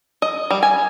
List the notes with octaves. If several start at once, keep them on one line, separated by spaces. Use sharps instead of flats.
D#5
G3
G#5